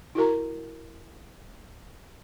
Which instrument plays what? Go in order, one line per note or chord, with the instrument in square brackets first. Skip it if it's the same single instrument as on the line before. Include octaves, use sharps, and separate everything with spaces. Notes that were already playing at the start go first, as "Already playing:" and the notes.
[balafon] E4 F#4 A#4 A#5